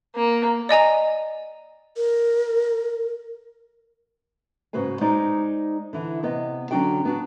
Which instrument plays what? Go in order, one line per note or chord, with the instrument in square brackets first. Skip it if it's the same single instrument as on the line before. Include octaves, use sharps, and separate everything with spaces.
[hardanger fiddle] A#3
[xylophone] D5 D#5 G#5 A#5
[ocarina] A#4
[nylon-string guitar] G#2 C#3 F#4 B4 C5 G#5
G#3 D#4 C5 D5
D3 E3
C3 B3 D#5
D3 F#3 C#4 D4 F#4 G5
B3 D4 F#4